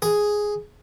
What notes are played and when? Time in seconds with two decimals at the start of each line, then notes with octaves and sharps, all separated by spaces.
0.02 G#4